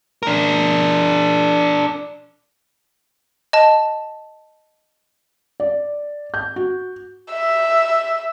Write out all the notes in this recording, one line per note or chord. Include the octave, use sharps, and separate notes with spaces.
D4 A#4
D#5 A5
D5
G6
F#4
E5